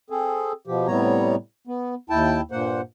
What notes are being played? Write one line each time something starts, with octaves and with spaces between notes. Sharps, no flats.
C4 G#4 A4
B2 F3 G4
A2 C3 G3 B3 C#5 A#5
B3
D#2 E4 G5 A5
G2 A#2 A#3 C5 F#5